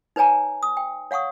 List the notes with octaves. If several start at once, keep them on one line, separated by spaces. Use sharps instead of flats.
D#4 B4 C#5 G#5 A#5
D#6
G5
C#5 F5 F#5 C#6 D#6